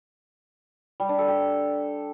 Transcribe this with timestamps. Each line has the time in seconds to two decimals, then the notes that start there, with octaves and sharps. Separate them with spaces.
1.00 G3
1.09 D4
1.19 A4
1.28 G4